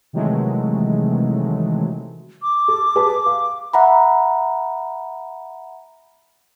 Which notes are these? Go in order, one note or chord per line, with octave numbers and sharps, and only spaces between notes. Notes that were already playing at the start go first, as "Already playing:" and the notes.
C3 D#3 E3 F#3 G#3 A3
D6
A4
G#4 B4 A5
F5
E5 F#5 A#5 B5